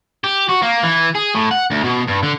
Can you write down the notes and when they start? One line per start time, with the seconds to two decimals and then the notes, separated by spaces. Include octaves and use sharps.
0.24 G4
0.49 F#4
0.63 A#3
0.83 E3
1.15 G#4
1.35 A2
1.51 F#5
1.71 D2
1.84 B2
2.08 G2
2.23 D3